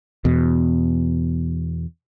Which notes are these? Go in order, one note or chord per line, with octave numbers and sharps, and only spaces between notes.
E2 B2